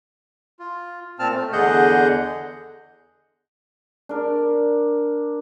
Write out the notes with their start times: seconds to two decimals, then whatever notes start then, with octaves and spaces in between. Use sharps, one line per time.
0.59 F4
1.19 A#2 C4 A5 F6
1.33 A3
1.53 E2 D3 G#4 D#5 F#5 G6
4.09 D4 A#4